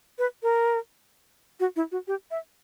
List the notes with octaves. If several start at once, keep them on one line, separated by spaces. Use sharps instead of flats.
B4
A#4
F#4
E4
F#4
G4
E5